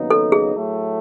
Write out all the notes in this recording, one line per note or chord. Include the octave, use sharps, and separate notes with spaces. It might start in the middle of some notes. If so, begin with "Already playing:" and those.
Already playing: D#2 C#3 F#3 B3 D#4
A4
G#4
A2 F#3 A3